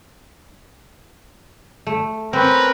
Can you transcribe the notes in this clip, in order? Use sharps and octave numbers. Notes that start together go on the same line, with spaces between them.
A3
C4 C#4 A#4 B4